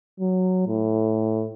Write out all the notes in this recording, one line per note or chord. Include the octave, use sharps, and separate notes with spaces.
F#3
A2